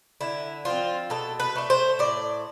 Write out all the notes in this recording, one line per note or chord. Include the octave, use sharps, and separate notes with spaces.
D3 E4
F3 C4 F4
B2 A4
B4
A3 D4
C5
A2 D5